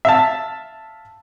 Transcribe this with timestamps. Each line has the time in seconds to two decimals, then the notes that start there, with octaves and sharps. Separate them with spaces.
0.05 E5 F5 A5